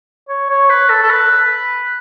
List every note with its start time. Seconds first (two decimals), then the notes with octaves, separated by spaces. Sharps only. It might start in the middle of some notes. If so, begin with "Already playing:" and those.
0.29 C#5
0.50 C#5
0.70 B4
0.89 A4
1.03 A4
1.10 B4